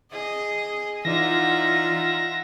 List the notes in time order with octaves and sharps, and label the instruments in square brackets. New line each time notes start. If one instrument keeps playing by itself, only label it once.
[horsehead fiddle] G#4 [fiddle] D#5
[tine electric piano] E3 D5 [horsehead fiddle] D#4 F4 [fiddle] E5 F#5 [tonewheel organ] A#6